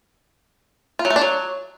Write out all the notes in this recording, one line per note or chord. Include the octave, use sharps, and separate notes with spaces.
F4
F#3
A3
D4
F#3